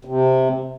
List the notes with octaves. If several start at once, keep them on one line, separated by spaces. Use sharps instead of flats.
C3